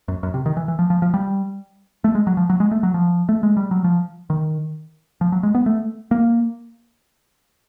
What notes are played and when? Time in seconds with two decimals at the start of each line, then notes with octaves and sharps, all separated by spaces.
0.08 F#2
0.23 F#2
0.34 C3
0.46 D#3
0.57 E3
0.68 E3
0.79 F3
0.90 F3
1.02 F3
1.14 G3
2.04 A3
2.15 G#3
2.27 F#3
2.37 F3
2.50 F#3
2.60 G#3
2.71 A3
2.83 F#3
2.94 F3
3.29 A3
3.43 G#3
3.57 G3
3.71 F#3
3.84 F3
4.30 D#3
5.21 F3
5.32 F#3
5.43 G#3
5.55 B3
5.66 A3
6.11 A#3